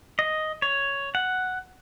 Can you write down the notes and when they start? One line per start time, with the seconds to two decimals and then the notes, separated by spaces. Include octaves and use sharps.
0.19 D#5
0.62 C#5
1.15 F#5